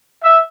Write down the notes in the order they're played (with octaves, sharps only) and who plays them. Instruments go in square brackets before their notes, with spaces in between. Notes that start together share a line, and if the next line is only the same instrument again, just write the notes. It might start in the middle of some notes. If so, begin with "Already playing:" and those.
[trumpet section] E5